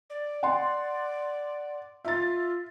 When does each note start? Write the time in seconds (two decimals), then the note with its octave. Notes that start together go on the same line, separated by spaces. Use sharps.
0.10 D5
0.43 F#5 C6
2.05 F4 E5 A6